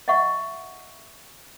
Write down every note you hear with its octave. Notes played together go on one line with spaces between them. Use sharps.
D#5 E5 F#5 C#6